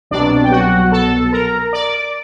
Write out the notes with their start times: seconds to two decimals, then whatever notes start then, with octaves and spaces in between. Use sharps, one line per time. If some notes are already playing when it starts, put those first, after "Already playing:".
0.11 C2 B2 F#3 D4 D5
0.44 G5
0.51 F#4 F#5
0.92 A4 A5
1.32 A#4 A#5
1.73 D5 D6